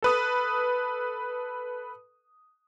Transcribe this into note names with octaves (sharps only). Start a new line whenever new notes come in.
A4 B4 D#6